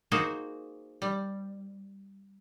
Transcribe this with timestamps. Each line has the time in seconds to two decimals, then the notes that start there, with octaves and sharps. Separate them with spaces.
0.12 A#3 D#4 F#4 G#4 C5
1.02 G3